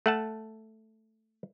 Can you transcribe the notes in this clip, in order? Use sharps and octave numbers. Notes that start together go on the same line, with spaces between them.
A3 F#5 A5